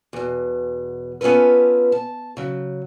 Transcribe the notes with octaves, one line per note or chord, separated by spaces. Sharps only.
E2 B2
B3 C#4 F4 A4 B4
A5
C#3 F#3